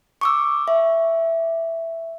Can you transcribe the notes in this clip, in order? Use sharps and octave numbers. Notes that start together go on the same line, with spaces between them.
C#6 D6 E6
E5